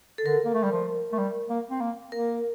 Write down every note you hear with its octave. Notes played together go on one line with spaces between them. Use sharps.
A4
D3 A#4
A#3
A3
G3
F3
A3
G3
A#3
C4
A#3
A#3 A#4